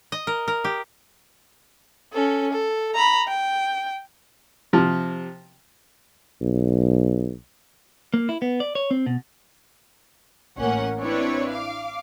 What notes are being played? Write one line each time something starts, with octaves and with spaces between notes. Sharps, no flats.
D#5
A#4
A#4
G4
C#4 A4
A4
A#5 B5
G5
C3 F3
B1
A#3
E4
B3
D5
C#5
C4
B2
A1 A#3 C#4 F#5
C4 D4 E4 B4 C#5
F5 D6